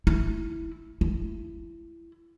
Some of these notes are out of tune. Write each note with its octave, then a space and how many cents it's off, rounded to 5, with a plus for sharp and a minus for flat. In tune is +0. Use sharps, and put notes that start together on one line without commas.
E4 -5
E4 +20